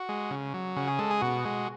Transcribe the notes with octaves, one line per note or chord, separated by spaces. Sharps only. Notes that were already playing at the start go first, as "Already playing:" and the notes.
Already playing: F#4
G#3
C#3
F#3
C#3 F#4
G#4
G#3 A4
G#4
B2 F#4
G#3